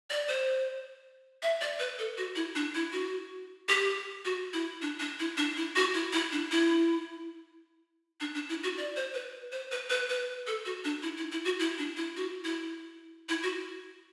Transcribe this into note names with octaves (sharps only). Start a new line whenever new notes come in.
D5
C5
E5
D5
B4
A4
F#4
E4
D4
E4
F#4
G4
F#4
E4
D4
D4
E4
D4
E4
F#4
E4
E4
D4
E4
D4
D4
E4
F#4
D5
C5
B4
C5
B4
B4
B4
A4
F#4
D4
E4
E4
E4
F#4
E4
D4
E4
F#4
E4
E4
F#4